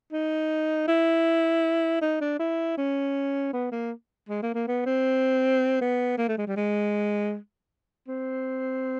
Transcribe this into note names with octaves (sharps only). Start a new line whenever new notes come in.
D#4
E4
D#4
D4
E4
C#4
B3
A#3
G#3
A#3
A#3
B3
C4
B3
A#3
A3
G#3
G3
G#3
C4